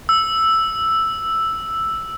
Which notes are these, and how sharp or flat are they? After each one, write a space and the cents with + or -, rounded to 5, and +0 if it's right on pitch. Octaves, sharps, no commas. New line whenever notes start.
E6 +0